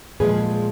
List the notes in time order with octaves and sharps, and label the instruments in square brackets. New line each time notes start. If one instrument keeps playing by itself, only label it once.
[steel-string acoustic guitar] A#2 F3 G#3 G#4 B4